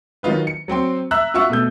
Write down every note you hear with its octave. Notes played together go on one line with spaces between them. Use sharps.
D#3 F#3 D#4 F4 B4
C#7
F#3 C4 G5 C6
E5 A#5 E6 F#6
F4 F#4 E5 F5 C#6 E6
B2 A3 G6